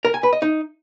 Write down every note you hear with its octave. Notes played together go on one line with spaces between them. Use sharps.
A#4
G#5
B4
D#5
D#4